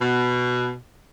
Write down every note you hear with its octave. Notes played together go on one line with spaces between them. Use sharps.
B2